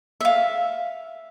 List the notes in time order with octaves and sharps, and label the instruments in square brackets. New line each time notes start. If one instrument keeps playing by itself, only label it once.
[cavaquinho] E5 F5